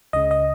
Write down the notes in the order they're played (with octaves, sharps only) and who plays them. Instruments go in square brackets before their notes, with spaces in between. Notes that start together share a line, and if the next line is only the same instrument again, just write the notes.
[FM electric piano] C#2 C#3 D#5
D#5